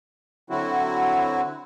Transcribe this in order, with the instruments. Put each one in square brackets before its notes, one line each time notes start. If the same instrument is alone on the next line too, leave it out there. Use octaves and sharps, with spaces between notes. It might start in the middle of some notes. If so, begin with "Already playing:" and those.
[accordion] D3 F#3 C4 E4 F#4